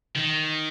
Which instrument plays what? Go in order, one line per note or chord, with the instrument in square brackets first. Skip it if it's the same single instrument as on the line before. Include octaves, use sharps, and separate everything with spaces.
[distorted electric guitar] D#3